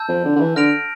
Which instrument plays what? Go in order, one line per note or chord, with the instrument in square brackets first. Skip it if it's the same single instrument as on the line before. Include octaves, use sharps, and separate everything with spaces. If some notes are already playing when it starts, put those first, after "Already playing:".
Already playing: [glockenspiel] A5 E6 G6
[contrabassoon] F2
D3
D3
E3
[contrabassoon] D3 [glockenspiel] F6 A#6 D7 F7